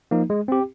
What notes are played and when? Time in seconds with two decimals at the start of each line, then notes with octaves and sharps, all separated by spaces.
0.11 F3 A#3 D#4
0.30 G#3
0.48 C4 G4